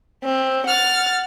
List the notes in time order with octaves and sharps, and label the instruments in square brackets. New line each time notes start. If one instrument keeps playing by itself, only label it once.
[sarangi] C4
[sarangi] F#5 [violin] F6 A6